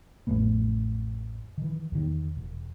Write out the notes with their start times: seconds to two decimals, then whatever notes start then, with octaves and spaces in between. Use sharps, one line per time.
0.27 A1 F2 A3 B3
1.58 D#3 E3
1.92 E2 D#3
2.37 E1